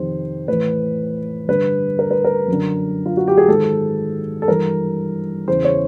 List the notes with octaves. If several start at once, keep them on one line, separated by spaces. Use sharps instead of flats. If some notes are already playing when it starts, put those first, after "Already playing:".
Already playing: F2 C3 D#3 C5
A2 E3 B4
G2 D3 B4
A#4
B4
A#4
F#2 D3
F4
F#4
G4
G#4
G#2 D#3 A4
A4
G2 E3 A#4
E2 C#3 E3 C5
C#5